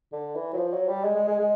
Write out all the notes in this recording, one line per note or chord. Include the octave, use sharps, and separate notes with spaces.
D3
E3
F#3
F3
F#3
G3
G#3
G#3
G#3
G#3